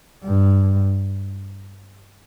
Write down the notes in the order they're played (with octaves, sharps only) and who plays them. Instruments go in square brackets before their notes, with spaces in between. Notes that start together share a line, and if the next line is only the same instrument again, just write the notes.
[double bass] G2